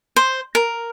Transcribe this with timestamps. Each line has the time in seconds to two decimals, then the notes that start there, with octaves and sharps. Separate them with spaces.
0.16 C5
0.55 A#4